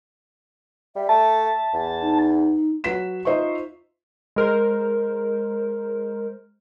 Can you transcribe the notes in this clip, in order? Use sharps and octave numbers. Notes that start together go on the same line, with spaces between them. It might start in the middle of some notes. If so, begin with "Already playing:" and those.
G3 E5
A3 A5
E2
D#4
F#3 F#4 B4 B6 E7
D#4 F4 C5 D#5 E5 C#6
G#3 A#4 C5